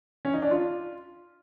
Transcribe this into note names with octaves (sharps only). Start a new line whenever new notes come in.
C#4
D#4
D4
F4